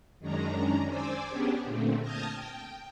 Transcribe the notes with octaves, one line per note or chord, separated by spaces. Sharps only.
F#2 D#3 G#3 C#4 D4 A#5
C5 D5 G#5 D6 E6
B3 C#4 D4 G4 G#4
A#2 D3 A3 C4
A5 D#6 F6 G6 G#6 A#6
G5